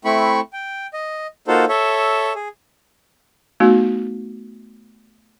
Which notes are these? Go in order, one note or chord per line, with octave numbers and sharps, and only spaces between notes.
A3 C4 E4 B5 C#6
G5
D#5
A#3 D#4 F4 F#4 A4 C5
A4 C#5 E5
G#4
A3 B3 D#4 F#4